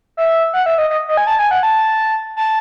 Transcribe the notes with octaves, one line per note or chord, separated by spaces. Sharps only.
E5
F#5
E5
D#5
D#5
D#5
G#5
A5
G#5
F#5
A5
A5